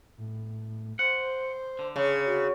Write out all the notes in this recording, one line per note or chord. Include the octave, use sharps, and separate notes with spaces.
A2
C5 F#5
D3
C#3 C#5
F#4